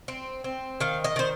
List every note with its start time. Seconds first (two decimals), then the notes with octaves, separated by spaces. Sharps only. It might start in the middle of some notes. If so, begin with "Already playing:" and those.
0.08 C4
0.44 C4
0.80 D#3 F5
1.04 D#5
1.16 D#3 C5